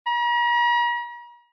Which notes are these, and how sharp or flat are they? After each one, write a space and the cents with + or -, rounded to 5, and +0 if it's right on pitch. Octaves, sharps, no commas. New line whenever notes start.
A#5 +45